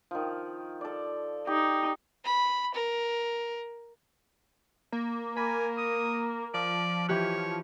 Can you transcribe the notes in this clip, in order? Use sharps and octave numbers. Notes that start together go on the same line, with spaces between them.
D#3 F3
A4 D5
D#4 G4
B5
A#4
A#3
A#4 G#5 B5
D#6
F3 D5
E3 G4 C#5 F#6